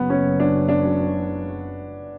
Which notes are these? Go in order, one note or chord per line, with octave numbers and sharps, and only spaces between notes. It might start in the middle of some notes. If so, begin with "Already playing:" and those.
Already playing: F#1 F#2 C#3 F#3 B3
C#4
D4
D4